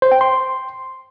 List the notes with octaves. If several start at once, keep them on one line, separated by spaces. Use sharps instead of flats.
C5
G5
C6